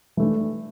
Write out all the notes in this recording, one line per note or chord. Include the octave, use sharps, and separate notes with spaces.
E3 A3 D4